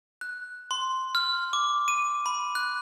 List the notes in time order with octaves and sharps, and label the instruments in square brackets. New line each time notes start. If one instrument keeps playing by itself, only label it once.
[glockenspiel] F#6
C6
F6
D6
D#7
B5
F#6